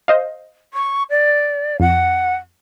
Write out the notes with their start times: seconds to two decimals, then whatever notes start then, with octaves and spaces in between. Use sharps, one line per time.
0.08 C5 D#5 F5
0.73 C#6
1.10 D5
1.80 F2 F#5